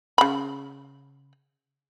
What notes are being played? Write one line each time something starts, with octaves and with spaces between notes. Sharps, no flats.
C#3 B5